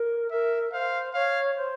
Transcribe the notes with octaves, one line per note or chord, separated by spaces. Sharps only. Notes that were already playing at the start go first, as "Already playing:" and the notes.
Already playing: A#4
A#4 E5
C5 F5
C#5 F5
C5